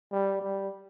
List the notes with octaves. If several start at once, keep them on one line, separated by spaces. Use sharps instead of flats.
G3
G3